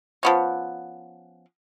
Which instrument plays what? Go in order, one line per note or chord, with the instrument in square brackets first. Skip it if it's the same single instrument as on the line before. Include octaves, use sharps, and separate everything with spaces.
[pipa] F3 B3 C#4